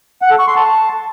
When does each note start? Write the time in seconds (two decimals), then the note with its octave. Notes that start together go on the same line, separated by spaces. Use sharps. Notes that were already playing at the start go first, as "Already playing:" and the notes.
0.22 F#5
0.30 A4
0.39 C#6
0.48 C6
0.56 A5